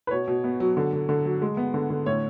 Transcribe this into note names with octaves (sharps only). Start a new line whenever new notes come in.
B4
B2 C#5
B2
B3
F#3
D3
D3
D3
F#3
G#3
B3
D3
D3
A2 C#5